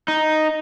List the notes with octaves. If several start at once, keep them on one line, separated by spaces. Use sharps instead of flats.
D#4